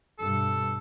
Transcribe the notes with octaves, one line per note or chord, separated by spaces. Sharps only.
G2 B2 A4